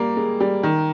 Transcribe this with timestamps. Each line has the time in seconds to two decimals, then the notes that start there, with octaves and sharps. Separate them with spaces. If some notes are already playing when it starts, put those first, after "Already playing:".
Already playing: G3 A#3
0.17 G#3
0.40 G3
0.63 D#3